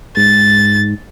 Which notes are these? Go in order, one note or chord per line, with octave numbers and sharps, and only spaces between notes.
G#2 A6